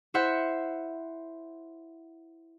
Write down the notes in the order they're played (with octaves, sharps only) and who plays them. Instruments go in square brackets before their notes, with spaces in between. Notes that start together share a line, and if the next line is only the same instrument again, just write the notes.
[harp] E4 C5 E5 F#5